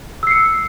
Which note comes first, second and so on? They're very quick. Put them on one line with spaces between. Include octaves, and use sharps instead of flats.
E6 C7 C#7